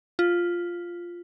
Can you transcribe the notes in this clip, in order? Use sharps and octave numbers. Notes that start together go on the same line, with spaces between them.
F4